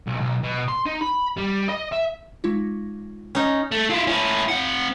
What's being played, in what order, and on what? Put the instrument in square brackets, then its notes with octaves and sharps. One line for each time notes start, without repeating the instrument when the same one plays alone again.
[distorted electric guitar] B1
B1
B2
C6
D#4
B5
G3
D#5
E5
[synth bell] G#3 D#4 F4
[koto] C#4 D#4
[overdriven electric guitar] A3
E4 F4
C#4 E4
C4 F#5